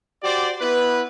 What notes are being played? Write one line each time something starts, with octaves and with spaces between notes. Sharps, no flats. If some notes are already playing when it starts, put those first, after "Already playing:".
F#4 G4 C5 D5
B3 E4 B4